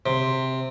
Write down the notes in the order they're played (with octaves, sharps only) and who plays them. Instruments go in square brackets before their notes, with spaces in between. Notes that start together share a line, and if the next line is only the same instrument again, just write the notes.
[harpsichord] C3